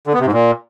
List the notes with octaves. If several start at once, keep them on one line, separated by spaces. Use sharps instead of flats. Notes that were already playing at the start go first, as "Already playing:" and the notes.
D3
B3
C3
G#2
A#2